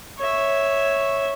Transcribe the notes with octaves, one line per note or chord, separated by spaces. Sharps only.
C#5 E5